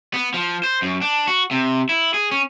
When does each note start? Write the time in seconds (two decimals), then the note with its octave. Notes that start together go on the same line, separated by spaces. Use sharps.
0.14 B3
0.34 F3
0.63 C5
0.82 F#2
1.02 D4
1.27 F#4
1.51 C3
1.89 E4
2.14 G#4
2.31 C#4